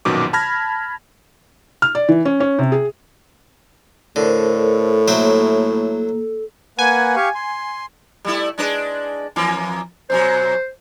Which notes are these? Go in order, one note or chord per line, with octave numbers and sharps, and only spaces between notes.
A#1 F#2 B2 D#3 D6
A5 B5 F6 G#6 A#6
F6
D5
E3
C#4
C#4
C3
G#4
A2 D3 A4 A#4 C5
F#3 A#3 C5 E5
A#3 B4 F#5 G#5
G4 F5 C#6
C6
G3 A3 E4
G#3 D4 B4
F2 E3 A#3
F#2 B2 F#3 C5